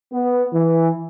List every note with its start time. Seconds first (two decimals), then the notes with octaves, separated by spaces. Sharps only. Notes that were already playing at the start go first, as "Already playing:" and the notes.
0.12 B3
0.53 E3